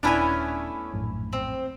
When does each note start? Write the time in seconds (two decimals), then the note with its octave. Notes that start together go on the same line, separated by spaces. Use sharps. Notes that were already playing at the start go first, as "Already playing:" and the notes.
0.03 D#1 A3 B3 C#4 D4 E4 G#5
0.94 A#1 F#2 A2
1.33 C4